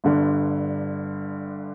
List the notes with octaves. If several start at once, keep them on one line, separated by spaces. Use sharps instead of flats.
G1 G2 D3